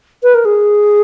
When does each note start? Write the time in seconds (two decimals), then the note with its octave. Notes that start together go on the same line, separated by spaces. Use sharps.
0.23 B4
0.34 A#4
0.45 G#4